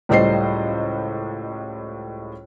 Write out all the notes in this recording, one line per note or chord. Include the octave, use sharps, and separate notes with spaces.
C#2 A2 G3 C5 D#5 C7